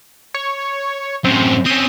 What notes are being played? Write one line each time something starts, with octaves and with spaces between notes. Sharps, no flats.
C#5
F#2 A2 C4
C4 C#4 D#6